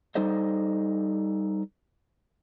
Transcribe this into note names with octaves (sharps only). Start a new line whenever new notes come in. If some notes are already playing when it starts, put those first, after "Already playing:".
G3 D#4 A4 C5 D#5